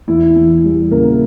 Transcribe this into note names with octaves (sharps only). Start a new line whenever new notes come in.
E2 E4
E2
G3
C#3 A#3 A#4